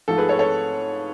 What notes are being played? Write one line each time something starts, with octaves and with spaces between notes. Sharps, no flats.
G#2 F3 A3 A4
G#4 B4
A4 C#5
A4 C#5